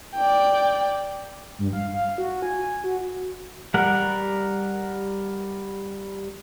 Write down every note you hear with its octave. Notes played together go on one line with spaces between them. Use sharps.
D5 G5
G2
F5
F5
F#4
G#5
F#4
G3 A#4 F#5